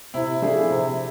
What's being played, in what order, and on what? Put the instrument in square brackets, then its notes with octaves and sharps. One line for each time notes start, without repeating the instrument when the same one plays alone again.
[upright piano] C3 [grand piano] E4
[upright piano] F3 A3 D4 G#4
C3